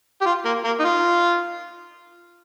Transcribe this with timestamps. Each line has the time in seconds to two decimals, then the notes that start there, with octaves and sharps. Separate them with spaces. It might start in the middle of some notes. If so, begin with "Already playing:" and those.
0.21 G4
0.26 F4
0.45 A#3
0.64 A#3
0.80 D#4
0.84 F4